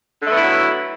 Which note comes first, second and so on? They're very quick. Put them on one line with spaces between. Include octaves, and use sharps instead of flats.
D3 A3 B3 E4 F#3